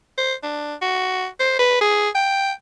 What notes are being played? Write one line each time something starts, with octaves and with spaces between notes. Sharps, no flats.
C5
D4
F#4
C5
B4
G#4
G5